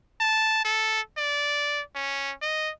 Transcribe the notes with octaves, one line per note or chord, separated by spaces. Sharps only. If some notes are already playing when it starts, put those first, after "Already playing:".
A5
A4
D5
C#4
D#5